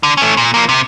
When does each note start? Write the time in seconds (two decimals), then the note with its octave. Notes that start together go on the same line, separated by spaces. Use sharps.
0.03 D3
0.17 A3 C#4
0.37 A#2
0.54 F3 A#3
0.69 C3